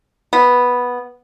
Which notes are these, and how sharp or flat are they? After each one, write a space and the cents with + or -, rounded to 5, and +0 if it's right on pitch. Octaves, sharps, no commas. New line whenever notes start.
B3 -5